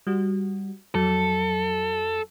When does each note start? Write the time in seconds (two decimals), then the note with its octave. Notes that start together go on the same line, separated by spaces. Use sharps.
0.07 G3 F#4
0.95 F2 F#3 A4